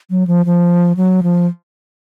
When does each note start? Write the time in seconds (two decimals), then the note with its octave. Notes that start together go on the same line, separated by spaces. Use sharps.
0.10 F#3
0.27 F3
0.46 F3
0.97 F#3
1.23 F3